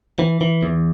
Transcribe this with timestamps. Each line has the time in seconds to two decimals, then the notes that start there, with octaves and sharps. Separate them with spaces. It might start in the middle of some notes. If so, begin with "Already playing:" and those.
0.19 E3
0.41 E3
0.63 E2